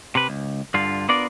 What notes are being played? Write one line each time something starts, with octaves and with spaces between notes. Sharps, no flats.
C3 B4
C#2
G2 D3 F4
B3 D4 F4 A#4 D5